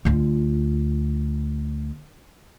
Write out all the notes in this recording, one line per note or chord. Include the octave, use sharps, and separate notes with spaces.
D2 F4